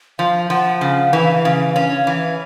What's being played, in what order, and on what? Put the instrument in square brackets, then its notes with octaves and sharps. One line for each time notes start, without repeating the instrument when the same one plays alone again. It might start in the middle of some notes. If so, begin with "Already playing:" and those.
[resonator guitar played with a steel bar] F3 [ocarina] F5
[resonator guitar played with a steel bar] F3 [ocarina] F#5
[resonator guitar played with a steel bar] C#3 [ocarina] F5
[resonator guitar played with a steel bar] E3
C#3
C#4
E3